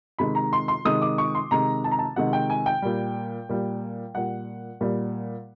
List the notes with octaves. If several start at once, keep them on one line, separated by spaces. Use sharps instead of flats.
C3 D#3 G#3 B5
A#5
C6
C6
C3 D#3 G#3 D#6
D6
C#6
C6
C3 D#3 G#3 A#5
A5
A#5
A5
C3 D#3 G#3 F#5
G5
G#5
G5
A#2 G3
A#2 G3
A#2 G3 F#5
A#2 G3